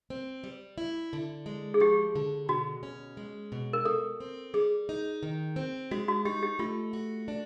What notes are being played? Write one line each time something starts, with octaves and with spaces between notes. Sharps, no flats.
C4
G3
E4
D3
G#3
G#4
F3 G4
D3
B2 F#4
C#4
G#3
B2
A#4
B2 A4
C4
G3 G#4
D#4
D#3
C4
G#3 F#4
F#4
D#4 G4
G4
A3 F4
F#4
D4